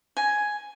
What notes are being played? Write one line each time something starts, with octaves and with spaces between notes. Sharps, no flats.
G#5